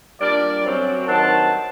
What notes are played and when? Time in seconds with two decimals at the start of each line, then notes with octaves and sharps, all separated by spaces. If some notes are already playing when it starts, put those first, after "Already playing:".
0.20 A#2 G3 D4 A#4 D5
0.64 F#2 F#3 C4
1.07 G2 D#3 F#3 C4 F#5 A5